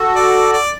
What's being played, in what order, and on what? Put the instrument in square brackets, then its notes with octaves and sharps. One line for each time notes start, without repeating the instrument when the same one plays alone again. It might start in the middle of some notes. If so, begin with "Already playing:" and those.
Already playing: [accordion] F#4 A4
[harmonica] D5
D5